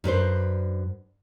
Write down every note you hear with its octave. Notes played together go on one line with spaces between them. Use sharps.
F#2 D4 B4 C5